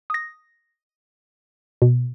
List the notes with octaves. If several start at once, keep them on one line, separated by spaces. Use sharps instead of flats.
D#6 A#6
B2